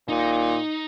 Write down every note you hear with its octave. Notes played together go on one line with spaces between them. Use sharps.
A#2 D#4